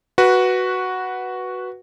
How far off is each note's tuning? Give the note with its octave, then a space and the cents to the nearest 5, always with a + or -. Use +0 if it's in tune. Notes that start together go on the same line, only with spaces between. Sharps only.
F#4 +0 B4 -10